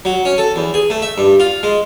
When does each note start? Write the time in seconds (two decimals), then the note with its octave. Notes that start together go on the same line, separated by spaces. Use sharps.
0.05 F#3
0.25 C#4
0.38 A4
0.56 E2
0.74 G#4
0.90 A3
1.02 E5
1.18 G2
1.40 F4
1.63 G#3